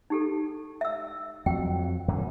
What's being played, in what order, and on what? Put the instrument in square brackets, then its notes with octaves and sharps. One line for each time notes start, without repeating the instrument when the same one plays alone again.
[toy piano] D#4 G4 A4
E5 E6
[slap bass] F2 F#3 [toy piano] G5
[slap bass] F#2 A#2 D3